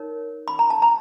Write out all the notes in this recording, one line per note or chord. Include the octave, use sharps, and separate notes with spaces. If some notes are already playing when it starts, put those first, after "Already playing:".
Already playing: D#4 A#4 C#5
B5
A#5
A5
A#5